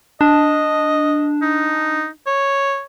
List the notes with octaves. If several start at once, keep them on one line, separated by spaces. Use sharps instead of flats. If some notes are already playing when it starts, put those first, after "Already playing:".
D4 D#5
D#4
C#5